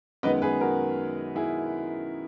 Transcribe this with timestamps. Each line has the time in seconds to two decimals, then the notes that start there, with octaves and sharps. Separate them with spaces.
0.23 F#2 D#3 G#3 B3 B4 D#5
0.42 G#4 B4
0.61 F#4 A#4
1.36 E4 G#4